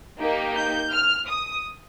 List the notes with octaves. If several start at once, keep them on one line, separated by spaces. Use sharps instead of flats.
A#3 D#4 G4
G6
F6
D#6